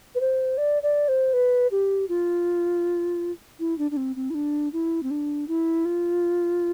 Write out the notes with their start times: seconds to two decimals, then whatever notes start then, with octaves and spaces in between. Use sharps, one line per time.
0.15 B4
0.21 C5
0.58 D5
0.83 D5
1.08 C5
1.33 B4
1.71 G4
2.09 F4
3.60 E4
3.78 D4
3.91 D4
3.97 C4
4.16 C4
4.30 E4
4.35 D4
4.73 E4
5.03 C4
5.11 D4
5.48 E4
5.85 F4